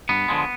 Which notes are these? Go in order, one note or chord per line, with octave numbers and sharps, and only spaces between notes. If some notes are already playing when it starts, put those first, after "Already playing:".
G2 B3
D3 F3 G#3